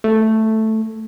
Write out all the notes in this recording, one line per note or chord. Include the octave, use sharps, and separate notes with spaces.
A3